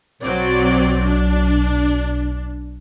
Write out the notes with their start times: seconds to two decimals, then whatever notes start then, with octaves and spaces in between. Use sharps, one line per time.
0.22 B1 F#3 C4 D5
1.06 D4